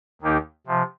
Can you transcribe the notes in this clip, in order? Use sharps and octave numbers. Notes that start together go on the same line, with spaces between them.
D#2 D#3 A#3 D#4 G4
C3 F3